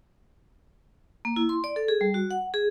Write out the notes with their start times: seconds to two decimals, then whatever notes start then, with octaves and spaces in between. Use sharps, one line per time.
1.25 A#3
1.36 E4
1.49 C6
1.64 D5
1.76 A4
1.88 G#4
2.01 G3
2.14 F#4
2.31 F#5
2.54 G#4